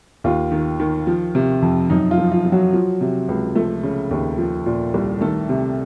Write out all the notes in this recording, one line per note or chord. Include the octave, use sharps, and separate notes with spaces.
D#2 F4
D#3
D#3
F3
C3
F2
F#2 D#4
F4
F3
F4
F3
F#3 F#4
F3
C3
C#2
F3 A3 A4
C#3
D#2
F3
A#2
C2
D#3 A3 A4
C3